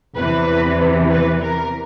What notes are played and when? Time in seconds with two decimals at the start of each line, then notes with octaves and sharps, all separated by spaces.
0.16 E2 C3 E3 B4
1.10 B4
1.41 A#4